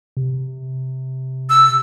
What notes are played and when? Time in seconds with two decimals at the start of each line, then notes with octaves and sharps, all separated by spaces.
0.17 C3
1.50 E6